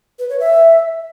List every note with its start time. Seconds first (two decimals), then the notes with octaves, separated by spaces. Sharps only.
0.19 B4
0.29 C#5
0.40 E5